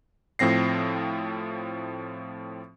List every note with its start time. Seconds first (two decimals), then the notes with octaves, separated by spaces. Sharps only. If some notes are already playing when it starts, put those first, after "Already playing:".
0.39 A2 F3 C4 A#6 C7